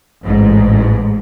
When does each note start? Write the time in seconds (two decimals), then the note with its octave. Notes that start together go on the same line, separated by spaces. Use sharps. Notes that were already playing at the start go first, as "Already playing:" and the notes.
0.24 A1 G#2